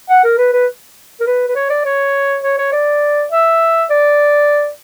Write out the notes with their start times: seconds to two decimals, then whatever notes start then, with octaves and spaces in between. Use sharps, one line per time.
0.09 F#5
0.24 A#4
0.38 B4
0.53 B4
1.20 A#4
1.26 B4
1.48 B4
1.55 C#5
1.70 D5
1.85 C#5
2.43 C#5
2.58 C#5
2.72 D5
3.31 E5
3.90 D5